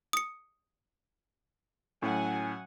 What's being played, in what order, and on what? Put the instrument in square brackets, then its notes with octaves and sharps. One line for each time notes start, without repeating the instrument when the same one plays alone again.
[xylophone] D#6 C#7
[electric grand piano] A2 C#4 [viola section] F#3 F#5 G#5